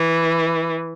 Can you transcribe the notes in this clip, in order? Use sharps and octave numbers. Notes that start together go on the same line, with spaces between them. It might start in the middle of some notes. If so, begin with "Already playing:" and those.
Already playing: E3